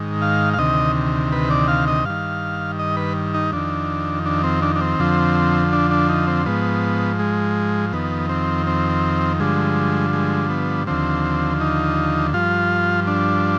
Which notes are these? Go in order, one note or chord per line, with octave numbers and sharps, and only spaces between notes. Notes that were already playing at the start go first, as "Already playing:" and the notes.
Already playing: G#2 D#3
F5
F5
D2 C3 D#3 D#5
B4
D5
F5
D#5
G2 D#3 F5
D#5
B4
D#4
F2 D#3 D4
D4
C4
D4
D4
C4
F2 D3 F3
D4
D4
D#4
C4
G#2 F3 B3
G#3
F2 D#3 B3
C4
C4
G2 D3 F3 G#3
G#3
B3
D#2 D3 F3 C4
D#4
G2 F3 F4
D4